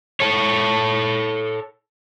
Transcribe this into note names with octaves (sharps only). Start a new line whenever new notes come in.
A4 C#5